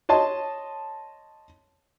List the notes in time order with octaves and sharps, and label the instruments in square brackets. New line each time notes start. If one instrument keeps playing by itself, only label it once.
[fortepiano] C#5 D#5 A5 C6